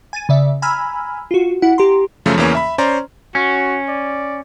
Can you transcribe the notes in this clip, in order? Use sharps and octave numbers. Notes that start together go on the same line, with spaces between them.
G#5 A6 D#7
C#3 D5 E5
G#5 A#5 B5 E6 F6
F4 F#4
E4 F#5
G4 A#5 C6
F#2 C#3 F3 A3
E2 C#3 E3 A#3 C#4
E5 B5
C#4 C5 D5 A#5 C6
C#4 F#4
D5